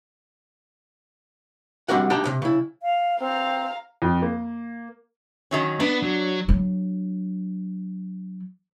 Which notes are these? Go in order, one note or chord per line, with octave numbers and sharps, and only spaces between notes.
G3 C4 D4 F#4 A#4 F#5
D4 D#4 G4 G5 A5 A#5
D2 C3
C#3 E4
F5
C4 F5 A#5
F2
A#3
D#3 F#3 C#4
B3 D4
F#3
F#3 D4